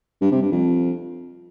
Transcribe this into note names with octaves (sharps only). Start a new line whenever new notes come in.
G2
C3
G2
F2